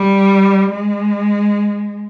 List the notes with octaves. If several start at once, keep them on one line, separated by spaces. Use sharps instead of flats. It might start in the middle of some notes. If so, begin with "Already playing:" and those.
Already playing: G3
G#3